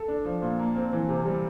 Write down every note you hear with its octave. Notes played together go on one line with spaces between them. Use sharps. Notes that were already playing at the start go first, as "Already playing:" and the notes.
Already playing: A4
D4
F3
A#2
A#3
C4
E3
C3
G3